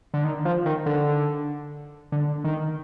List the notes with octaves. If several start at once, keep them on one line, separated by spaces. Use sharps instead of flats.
D3
D#3
F3
D#3
D3
D3
D#3